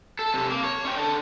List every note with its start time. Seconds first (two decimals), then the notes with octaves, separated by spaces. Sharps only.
0.19 A4
0.34 C3 A4
0.51 A#3
0.64 C#5
0.85 C#4 G5
0.97 D4 A4